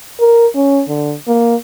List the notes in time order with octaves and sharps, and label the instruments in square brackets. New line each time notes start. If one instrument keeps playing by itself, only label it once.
[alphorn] A#4
C#4
D3
A#3